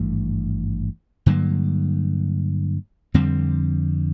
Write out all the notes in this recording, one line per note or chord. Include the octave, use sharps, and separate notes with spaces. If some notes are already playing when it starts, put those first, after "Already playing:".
Already playing: G#1 G2 E3 A3
G2 D3 F#3 A#3
F2 D3 G3 C4